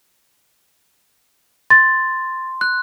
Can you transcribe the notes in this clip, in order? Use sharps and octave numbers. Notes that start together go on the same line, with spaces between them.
C6 A6
F#6